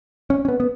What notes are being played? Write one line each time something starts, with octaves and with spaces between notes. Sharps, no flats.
C#4
C#4
B3
B3